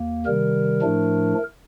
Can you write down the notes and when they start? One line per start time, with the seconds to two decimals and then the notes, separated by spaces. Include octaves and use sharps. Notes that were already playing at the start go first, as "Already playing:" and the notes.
Already playing: D#2 A#3
0.26 C3 D#3 G3 A#4
0.82 A2 F3 A3 D4